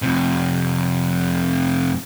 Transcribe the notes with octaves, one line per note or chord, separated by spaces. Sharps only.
F2 C3